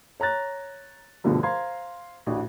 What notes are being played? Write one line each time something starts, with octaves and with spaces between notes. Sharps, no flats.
C#5 A#5 F#6 A6
C2 G2 B2 D3 F3 A3
C5 F5 A#5 C6 G#6
A1 D2 D4 F#4